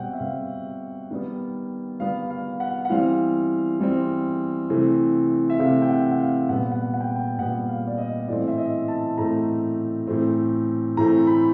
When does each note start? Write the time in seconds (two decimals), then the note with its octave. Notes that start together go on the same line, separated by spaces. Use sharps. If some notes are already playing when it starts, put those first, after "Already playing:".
Already playing: B2 G3 C4 F#5 G5
0.13 E5
0.21 B2 G3 C4 F5
1.11 D#3 G3 B3
2.00 D#3 G3 B3 F5
2.30 F5
2.60 F#5
2.85 F#5
2.90 E3 G3 C4 F5
3.80 E3 G3 C4
4.69 C3 E3 A3 C4
5.50 E5
5.59 C3 E3 A3 C4 F5
5.82 G5
5.89 F#5
6.11 F#5
6.19 F5
6.49 A#2 G3 B3 F#5
6.71 F#5
6.94 F#5
7.00 G5
7.08 F#5
7.16 G5
7.39 A#2 G3 B3 F#5
7.69 F5
7.87 D5
7.98 D#5
8.28 A2 E3 A3 C4 D5
8.48 E5
8.58 D#5
8.88 A5
9.18 A2 E3 A3 C4 A#5
10.07 A2 E3 A3 C4
10.97 A2 E3 A3 C4 A#5
11.27 B5